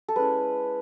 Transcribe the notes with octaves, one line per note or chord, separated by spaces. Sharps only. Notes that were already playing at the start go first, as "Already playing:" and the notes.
A4
G#3 C#4 E4 B4